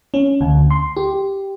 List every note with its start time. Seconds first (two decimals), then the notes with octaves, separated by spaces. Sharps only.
0.14 C#4
0.41 D2
0.71 C6
0.97 G4